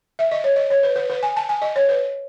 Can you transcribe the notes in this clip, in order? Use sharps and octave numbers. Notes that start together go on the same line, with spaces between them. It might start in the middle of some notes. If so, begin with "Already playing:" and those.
E5
D#5
C#5
D#5
C#5
B4
B4
B4
G#5
A5
G#5
D#5
C#5
B4